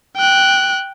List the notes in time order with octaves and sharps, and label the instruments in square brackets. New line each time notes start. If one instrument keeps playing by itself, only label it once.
[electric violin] G5 F#6